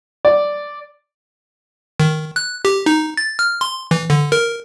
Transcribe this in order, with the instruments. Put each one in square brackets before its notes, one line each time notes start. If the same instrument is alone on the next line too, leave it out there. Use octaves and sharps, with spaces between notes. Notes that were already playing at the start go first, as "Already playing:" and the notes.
[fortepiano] D5
[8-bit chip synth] D#3
F#6
G4
D#4
A6
F6
C6
E3
D3
A#4